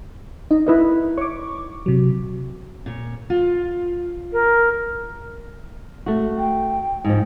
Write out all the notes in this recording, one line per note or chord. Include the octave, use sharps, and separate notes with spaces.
D#4 D#5
E4 B4 D#5
C#5 C#6 D6
C3 F#3
A#2 C#5
F4
A#4
A3 F#4
G5
G#2 F3